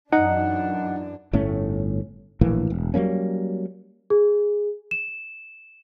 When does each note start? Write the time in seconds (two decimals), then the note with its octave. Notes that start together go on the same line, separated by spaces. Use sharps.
0.13 F#2 E3 D4 D#4 F#5
1.33 G1 A2 A3 C#4
2.41 A#1 A2 E3 A#3
2.70 E1
2.94 F#3 G3 A#3 C#4
4.10 G#4
4.91 E7